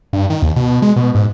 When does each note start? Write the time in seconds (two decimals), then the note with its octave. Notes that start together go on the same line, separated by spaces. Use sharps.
0.13 G2
0.30 D#3
0.42 D#2
0.56 B2
0.70 B2
0.82 G#3
0.96 B2
1.15 G#2